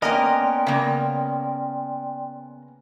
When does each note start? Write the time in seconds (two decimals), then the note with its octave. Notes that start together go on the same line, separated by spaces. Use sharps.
0.02 A#3 B3 C#4 A#4 D5 D#5 G5 C6
0.67 C#3 A#3